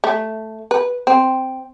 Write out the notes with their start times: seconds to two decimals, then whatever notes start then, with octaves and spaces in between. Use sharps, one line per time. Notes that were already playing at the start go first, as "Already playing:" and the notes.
0.04 A3
0.71 B4
1.07 C4